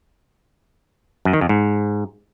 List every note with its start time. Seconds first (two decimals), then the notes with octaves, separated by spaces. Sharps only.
1.25 F#2
1.33 D#3
1.41 F2
1.49 G#2